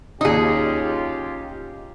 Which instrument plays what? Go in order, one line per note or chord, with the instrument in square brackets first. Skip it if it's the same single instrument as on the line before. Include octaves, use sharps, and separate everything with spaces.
[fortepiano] D#2 D#5 D#6 [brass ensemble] C#4 F4 G4 [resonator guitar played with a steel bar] D#4 G#4